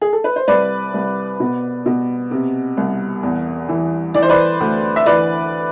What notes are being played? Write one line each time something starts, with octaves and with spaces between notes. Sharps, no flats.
G#4
A4
B4
C5
C2 B4 D5
C2
B2
B2
C3
C2
E2
E3
E3 D5
C5
B4 D5
D2
E5
E3 B4 D5